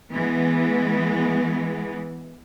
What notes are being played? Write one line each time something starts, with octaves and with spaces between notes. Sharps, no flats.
E3 G#3 B3